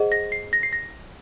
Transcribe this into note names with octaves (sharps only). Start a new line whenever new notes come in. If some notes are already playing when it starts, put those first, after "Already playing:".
Already playing: G#4 C5 D#5 F#5
A#6
C7
A#6
C7
A#6